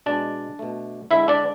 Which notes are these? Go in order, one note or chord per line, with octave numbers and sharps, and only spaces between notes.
B2 G#3 D4 D5
B2 A3
D3 G#3 E4 E5
D4 D5